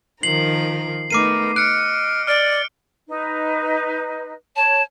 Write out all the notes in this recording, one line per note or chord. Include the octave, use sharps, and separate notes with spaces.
D#3 F3 A#4 C7 F#7
A3 B3 D#4 A#4 D6 C7 D#7
D#5 F6 F#6 C#7 D7
D5 F6 D7
D#4 B4
C#5 A5